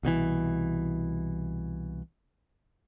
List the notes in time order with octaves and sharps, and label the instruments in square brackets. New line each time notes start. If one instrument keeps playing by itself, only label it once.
[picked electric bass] C2 B2 D#3 E3